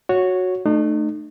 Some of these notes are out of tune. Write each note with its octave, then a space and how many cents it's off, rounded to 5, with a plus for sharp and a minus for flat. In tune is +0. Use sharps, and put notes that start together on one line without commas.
F#4 -10 C#5 +0
A3 +0 D#4 -40